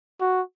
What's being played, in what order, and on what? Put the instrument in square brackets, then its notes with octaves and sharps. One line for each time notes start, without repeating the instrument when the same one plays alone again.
[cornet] F#4